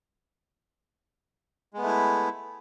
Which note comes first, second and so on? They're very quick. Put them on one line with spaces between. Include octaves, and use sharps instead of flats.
G#3 B3 A3 E4